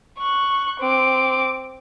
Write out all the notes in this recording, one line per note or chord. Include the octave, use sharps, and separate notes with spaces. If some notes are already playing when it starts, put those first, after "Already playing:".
C#6 F#6
C4 D6